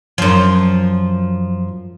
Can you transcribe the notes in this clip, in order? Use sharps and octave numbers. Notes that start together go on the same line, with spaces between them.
F#2 F3